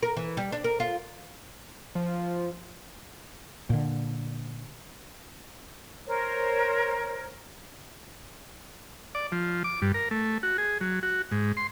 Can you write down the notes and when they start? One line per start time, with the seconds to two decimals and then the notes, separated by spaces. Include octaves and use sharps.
0.03 A#4
0.17 E3
0.37 G3
0.52 D4
0.64 A#4
0.80 F4
1.95 F3
3.70 A#2 D3
6.06 A#4 C5 C#5
9.15 D5
9.32 F3
9.64 D6
9.82 G2
9.94 A#4
10.11 A3
10.43 F#4
10.58 G#4
10.81 F#3
11.03 F#4
11.31 G#2
11.57 C6